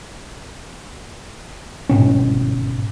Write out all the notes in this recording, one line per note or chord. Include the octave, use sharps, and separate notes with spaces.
G1 G#2 B2 C#4